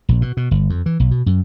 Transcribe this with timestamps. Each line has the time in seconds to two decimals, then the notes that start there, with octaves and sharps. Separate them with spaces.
0.09 A#1
0.22 B2
0.37 B2
0.51 G1
0.70 F2
0.86 E3
1.00 B1
1.11 B2
1.26 F#2